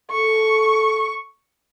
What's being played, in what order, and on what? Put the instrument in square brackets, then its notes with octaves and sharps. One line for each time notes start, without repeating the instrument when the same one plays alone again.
[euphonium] A4 [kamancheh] C#6